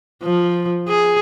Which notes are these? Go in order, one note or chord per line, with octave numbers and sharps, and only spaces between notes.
F3
G#4